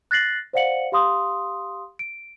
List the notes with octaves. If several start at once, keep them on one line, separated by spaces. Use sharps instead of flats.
F#6 A6 A#6 C7 F#7
C5 D5 F5 F#5 C#7 F#7
G4 F5 C6 D#6
D7